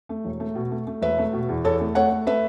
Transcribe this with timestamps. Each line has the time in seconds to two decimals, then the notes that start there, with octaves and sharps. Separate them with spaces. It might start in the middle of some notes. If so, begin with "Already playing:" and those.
0.09 A3
0.25 E1
0.40 A3
0.55 B2
0.71 A3
0.87 A3
1.02 E1 B4 E5
1.18 A3
1.33 B2
1.49 E2
1.64 E2 A4 C#5
1.80 A3
1.95 A3 C#5 F#5
2.11 A3
2.27 A3 B4 E5